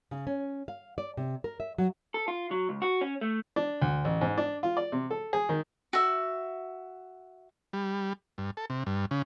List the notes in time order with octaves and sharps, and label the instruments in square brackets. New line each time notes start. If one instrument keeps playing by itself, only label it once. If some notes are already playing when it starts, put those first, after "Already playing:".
[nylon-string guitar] C#3
C#4
F5
D5
C3
A#4
E5
F#3
[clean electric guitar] A4
F4
F#3
C#2
F#4
C#4
A3
[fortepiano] D4
D2
A1
G#2
D4
F4
D5
C3
A4
G#4
D#3
[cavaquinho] F#4 E5
[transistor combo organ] G3
G2
A4
C3
G2
C#3